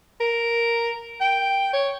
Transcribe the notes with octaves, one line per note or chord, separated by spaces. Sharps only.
A#4
G5
C#5